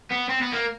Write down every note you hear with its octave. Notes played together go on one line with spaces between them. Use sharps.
B3
C4
B3
A#3